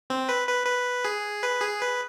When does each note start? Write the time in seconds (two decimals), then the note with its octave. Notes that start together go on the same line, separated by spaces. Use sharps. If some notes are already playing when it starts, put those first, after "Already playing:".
0.10 C4
0.29 B4
0.48 B4
0.66 B4
1.05 G#4
1.43 B4
1.62 G#4
1.81 B4